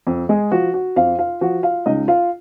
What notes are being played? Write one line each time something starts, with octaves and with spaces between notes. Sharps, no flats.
F2
G#3 G#4
F3 F#4
F#4
F2 F4 F5
F4 F5
F3 F#4 F#5
F4 F5
C#2 D#4 D#5
F4 F5